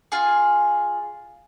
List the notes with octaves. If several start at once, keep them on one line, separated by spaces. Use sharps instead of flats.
F4 G#4